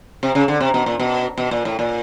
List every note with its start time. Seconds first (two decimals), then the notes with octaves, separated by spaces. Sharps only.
0.23 C3
0.35 C#3
0.48 D3
0.61 C3
0.74 B2
0.86 A#2
1.00 B2
1.38 B2
1.51 A#2
1.65 A2
1.79 A#2